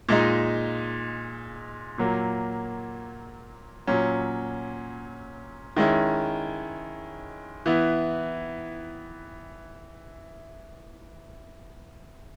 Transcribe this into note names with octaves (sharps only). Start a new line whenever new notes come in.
A#2 G#3 D#4
A#2 F#3 A#3
A#2 F#3 C#4
D#3 G#3 C#4 E4
E3 B3 E4